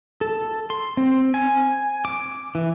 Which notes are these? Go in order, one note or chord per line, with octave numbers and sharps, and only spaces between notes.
A4
C6
C4
G#5
D6
E3